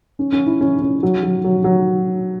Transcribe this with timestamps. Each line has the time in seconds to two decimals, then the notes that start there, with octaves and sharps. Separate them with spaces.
0.19 C#4
0.32 C#4
0.46 E4
0.61 C#4
0.82 C#4
1.03 F#3
1.23 F#3
1.44 F#3
1.64 F#3